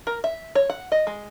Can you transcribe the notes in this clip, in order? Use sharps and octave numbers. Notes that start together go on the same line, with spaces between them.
A#4
E5
C#5
F#5
D#5
G#3